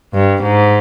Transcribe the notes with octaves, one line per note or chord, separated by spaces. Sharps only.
G2
G#2